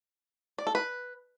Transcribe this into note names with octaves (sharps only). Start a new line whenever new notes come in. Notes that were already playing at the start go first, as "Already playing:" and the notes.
D5
A4
B4